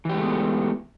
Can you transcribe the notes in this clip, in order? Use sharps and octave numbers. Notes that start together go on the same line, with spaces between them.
E3 G#3 A3 B3 G4